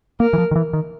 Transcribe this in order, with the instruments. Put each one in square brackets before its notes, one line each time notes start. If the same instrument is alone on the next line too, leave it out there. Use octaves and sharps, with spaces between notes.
[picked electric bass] A#3 [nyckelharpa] A#4
[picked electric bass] E3
F3
D#3
E3
D#3